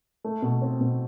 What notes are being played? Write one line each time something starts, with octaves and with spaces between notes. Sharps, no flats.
A3
B2
C4
B2